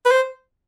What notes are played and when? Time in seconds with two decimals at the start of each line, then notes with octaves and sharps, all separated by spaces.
0.06 B4
0.11 C5